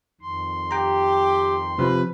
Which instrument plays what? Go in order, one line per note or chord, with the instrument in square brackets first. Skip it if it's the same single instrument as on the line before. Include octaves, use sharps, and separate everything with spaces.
[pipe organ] F2 D#3 C6
[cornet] G4 [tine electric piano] G5 A#5
[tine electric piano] C3 F3 [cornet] B4